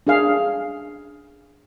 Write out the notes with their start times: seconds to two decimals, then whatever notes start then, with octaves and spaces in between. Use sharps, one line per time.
0.07 D4 G#4 F5